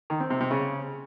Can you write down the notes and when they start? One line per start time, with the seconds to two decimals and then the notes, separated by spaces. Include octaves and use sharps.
0.10 D#3
0.20 C4
0.30 C3
0.40 C3
0.51 C#3